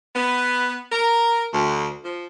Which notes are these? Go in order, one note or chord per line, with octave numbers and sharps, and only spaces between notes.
B3
A#4
D2
F3